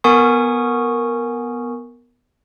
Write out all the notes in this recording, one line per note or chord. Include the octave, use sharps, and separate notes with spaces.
B3 A#4 G#5 C#6 D#6